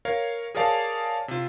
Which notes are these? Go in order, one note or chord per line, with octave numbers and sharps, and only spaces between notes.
A#4 C#5 F5
G#4 A#4 C#5 D5 F5 A5
C3 F4